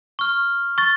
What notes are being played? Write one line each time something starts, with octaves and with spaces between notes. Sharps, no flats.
C#6 F6
C#6 A6